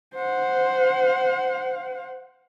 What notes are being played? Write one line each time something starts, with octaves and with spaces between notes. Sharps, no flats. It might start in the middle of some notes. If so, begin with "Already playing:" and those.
C5 F#5